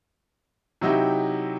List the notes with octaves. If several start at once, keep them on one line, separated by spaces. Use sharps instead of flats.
C3 F#3 D#4 E4 G4